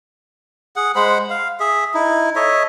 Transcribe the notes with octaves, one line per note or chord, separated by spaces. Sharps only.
G#4 F#5
G#3 C5 F#5 B5
F5
G#4 E5
D#4 E4
A4 C#5 D#5 E5